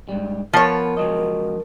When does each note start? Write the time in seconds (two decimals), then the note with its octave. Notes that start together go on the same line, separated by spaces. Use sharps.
0.09 G#2 G3
0.53 F3 B3 A#4 B4 C#5
0.97 C#2 F#3 D#5